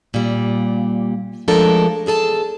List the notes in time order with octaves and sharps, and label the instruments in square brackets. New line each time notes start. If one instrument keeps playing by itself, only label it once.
[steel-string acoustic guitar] A#2 G3
F3 G#3 A3 D4 A4 A#4
E2 G#4 A4 A5